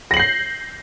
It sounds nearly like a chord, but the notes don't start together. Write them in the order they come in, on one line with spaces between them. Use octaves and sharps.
A#6 F#7 C7 G6